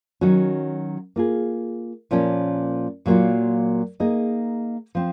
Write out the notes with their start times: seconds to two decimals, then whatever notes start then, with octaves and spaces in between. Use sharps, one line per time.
0.21 D#3 F#3 C#4 F#4
1.16 A#3 F4 G#4
2.11 A#2 F3 A#3 C#4
3.06 A#2 F#3 A#3 F4
4.00 A#3 D#4 G#4 D#5
4.95 F3 C4